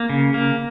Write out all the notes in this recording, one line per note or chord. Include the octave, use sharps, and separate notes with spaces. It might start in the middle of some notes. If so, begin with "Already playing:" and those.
Already playing: A#3
C#3
A#3